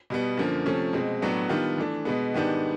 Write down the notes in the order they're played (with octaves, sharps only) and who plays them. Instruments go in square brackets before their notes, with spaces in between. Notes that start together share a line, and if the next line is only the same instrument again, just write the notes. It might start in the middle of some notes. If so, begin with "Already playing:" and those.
[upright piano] B2 G3 B3
F#2 D3 F3 A#3
C3 F3 A3 C#4
B2 G#3 C4
A2 F#3 B3 D4
D#3 G3 B3 D4 F4
E3 A3 D4
B2 G#3 B3
G#2 D#3 G3 B3 D4